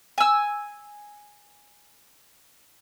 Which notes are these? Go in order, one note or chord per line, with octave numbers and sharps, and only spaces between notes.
G#5 E6